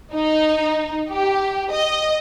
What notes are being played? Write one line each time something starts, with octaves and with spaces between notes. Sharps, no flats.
D#4
G4
D#5